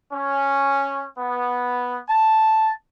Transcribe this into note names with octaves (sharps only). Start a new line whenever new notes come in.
C#4
B3
A5